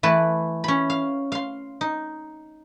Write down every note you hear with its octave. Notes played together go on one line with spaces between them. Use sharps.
E3 A3 B4 A5
C#4 B5
F5
F5 C6
D#4